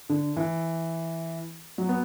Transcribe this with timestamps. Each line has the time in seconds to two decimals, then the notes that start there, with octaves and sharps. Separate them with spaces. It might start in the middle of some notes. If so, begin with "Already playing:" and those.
0.09 D3
0.37 E3
1.78 F#3
1.89 B3